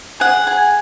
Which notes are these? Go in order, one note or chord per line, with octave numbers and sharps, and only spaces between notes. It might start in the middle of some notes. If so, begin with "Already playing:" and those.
G#4 F#5
G#4